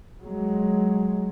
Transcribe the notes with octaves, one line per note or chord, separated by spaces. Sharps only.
F#3 G#3